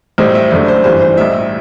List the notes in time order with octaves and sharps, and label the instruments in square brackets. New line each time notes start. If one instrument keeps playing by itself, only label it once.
[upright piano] B1 A2 G3 C5
E5
F#1 F#2 D3 A3 D5
C5
G1 G2 E3 G3 C5
C5
B1 A2 G3 E5